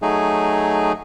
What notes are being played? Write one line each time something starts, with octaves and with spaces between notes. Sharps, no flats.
F#3 A3 D#4 G#4